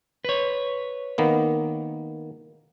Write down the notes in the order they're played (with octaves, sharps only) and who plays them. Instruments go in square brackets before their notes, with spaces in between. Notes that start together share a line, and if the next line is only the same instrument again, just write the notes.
[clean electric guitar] B4 C#5
[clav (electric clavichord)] D#3 A#3 B3